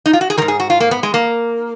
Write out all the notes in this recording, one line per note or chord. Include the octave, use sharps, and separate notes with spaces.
D#4
F4
F#4
G#4
D#3 A#4
G#2
G#4
F#4
F4
A#3
B3
G#3
A#3